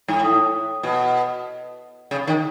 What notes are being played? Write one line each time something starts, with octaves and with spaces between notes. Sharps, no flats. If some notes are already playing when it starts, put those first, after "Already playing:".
G#2
A2
B2
C#3
D#3